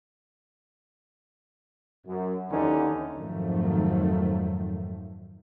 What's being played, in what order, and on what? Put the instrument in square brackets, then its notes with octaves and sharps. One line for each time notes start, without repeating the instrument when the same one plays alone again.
[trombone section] F#2
D#2 D3 E3 C#4 D#4
[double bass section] F2 G#2 D#3 F3 F#3 A3